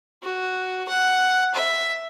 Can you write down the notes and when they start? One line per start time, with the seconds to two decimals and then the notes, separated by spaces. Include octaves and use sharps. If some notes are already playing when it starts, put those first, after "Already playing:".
0.23 F#4
0.89 F#5
1.54 E5